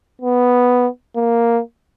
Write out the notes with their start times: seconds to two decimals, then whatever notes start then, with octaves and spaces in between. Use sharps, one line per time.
0.21 B3
1.16 A#3